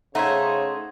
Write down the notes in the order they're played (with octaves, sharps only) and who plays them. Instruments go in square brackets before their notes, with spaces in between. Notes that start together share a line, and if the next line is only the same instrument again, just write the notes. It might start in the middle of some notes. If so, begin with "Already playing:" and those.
[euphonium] C#3 [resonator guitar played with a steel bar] A3 D#4 [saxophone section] C5 C#5 [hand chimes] F#5 C6 G#6